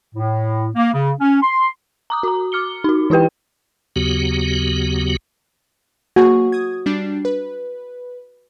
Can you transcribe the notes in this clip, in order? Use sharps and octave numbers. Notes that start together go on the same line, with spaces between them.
A2
A#3
C#3
C#4
C6
A#5 D6 D#6
F#4 A#5
D6 F6 C#7 G7
D#4 F#4
E3 E4 G4 B4 G5
D#2 C#3 F#3 B3 F#4 G4
A#3 F#4 G#4
D#6 G#6
G3 D4 C7
B4